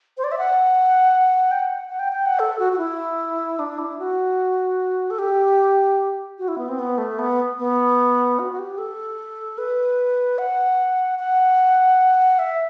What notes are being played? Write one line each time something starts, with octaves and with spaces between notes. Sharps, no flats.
C5
D5
E5
F#5
G5
F#5
F#5
G5
G5
F#5
A4
F#4
F#4
E4
D4
E4
F#4
A4
G4
F#4
E4
B3
C4
B3
A3
B3
B3
F#4
F#4
G4
A4
B4
F#5
F#5
E5